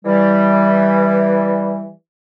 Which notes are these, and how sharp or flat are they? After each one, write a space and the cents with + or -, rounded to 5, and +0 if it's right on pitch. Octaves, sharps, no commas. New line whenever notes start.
E3 +0 G3 +0